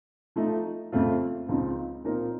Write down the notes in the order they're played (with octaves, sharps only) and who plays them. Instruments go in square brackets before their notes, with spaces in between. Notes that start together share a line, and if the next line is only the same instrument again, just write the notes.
[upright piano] F3 A3 D#4
F2 C#3 A3 C4 F4
C#2 C#3 F3 C4 D#4
A#2 F3 C4 D#4 A#4